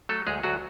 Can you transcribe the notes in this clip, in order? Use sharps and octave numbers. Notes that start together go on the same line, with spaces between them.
F#3 A3 A4
D2 G#3 G#4
D2 F#3 F#4